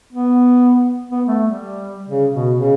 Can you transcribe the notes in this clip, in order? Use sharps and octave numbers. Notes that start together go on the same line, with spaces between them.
B3
B3
A3
G3
C#3
B2
C#3